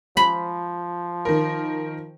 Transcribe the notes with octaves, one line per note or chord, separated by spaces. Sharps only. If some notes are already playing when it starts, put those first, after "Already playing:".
F3 B5
D#3 A#4